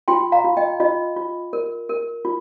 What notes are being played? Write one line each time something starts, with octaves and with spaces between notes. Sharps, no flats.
F4 G5 C6
F5 A#5
F4
D#5 G5
F4 D#5
F4
A#4
A#4
F4